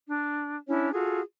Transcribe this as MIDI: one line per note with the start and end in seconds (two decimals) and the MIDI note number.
0.07 0.56 62
0.68 0.91 61
0.68 0.91 62
0.68 0.91 64
0.68 0.91 73
0.93 1.21 65
0.93 1.21 66
0.93 1.21 68
0.93 1.21 69